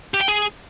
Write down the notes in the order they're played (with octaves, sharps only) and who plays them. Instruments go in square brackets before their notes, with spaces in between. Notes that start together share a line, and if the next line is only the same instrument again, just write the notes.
[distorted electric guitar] G4
G5
G#4